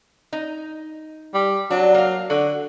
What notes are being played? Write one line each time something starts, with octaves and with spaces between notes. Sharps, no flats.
D#4
G3
F#3 D4
A#3 F5
D3 F#4